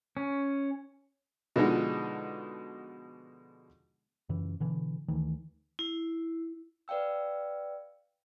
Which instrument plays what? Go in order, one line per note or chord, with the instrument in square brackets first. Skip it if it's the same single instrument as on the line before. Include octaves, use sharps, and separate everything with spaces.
[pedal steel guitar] C#4
[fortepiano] B2 D3 F3 G#3 D#4
[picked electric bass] F#2 C#3 E3
B2 D3 E3
D2 D#3 E3 A3
[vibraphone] E4
[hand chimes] B4 D5 F5 G5 E6